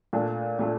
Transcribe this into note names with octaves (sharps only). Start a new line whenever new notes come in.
A#2 A3 D4
A#2 A3 D4